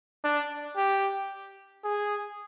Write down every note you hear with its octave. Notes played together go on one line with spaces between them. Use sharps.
D4
G4
G#4